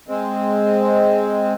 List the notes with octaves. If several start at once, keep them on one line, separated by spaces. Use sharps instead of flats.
G#3 C4